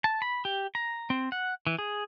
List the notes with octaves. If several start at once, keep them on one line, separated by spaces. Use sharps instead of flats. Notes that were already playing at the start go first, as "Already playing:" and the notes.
A5
B5
G4
A#5
C4
F#5
E3
G#4